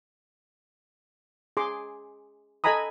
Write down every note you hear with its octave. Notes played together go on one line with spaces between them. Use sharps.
G#4 C6 D6
A4 D#5 G#5 A#5 B5 D#6